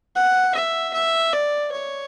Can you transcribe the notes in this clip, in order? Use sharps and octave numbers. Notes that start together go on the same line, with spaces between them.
F#5
E5
E5
D5
C#5